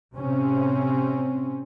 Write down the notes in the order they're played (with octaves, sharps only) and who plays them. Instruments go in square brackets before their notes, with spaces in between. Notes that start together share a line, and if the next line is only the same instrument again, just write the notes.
[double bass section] A2 C3 C4 C#4